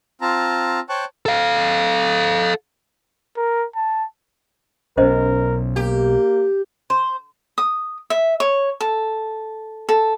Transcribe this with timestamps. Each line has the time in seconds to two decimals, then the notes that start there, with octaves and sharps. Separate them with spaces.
0.21 C4 F4 A5 A#5
0.89 C5 C#5 G5 A5 C#6 F#6
1.26 A4 F5
3.37 A#4
3.75 A5
4.97 B1 B2 C#4 A#4 C5 D#5
5.76 A#3 G4
6.90 C5
7.58 D#6
8.10 E5
8.40 C#5
8.81 A4
9.89 A4